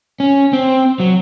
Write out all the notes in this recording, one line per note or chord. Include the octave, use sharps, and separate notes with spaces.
C#4
C4
F#3